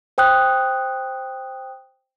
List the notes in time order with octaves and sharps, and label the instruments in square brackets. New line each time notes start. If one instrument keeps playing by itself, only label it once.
[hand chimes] C5 G5 D#6 F#6